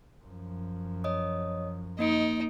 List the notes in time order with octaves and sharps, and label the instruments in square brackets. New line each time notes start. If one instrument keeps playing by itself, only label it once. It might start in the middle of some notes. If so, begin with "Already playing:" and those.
[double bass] F#2 F3
[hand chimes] C#5 D#5 D#6
[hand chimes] A#3 D#5 D7 [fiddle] D#4